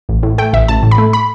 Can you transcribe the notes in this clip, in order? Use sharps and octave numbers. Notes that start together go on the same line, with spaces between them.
A1
A2
A3 G5
A1 E5
A1 A5
A2
B5
A3
B5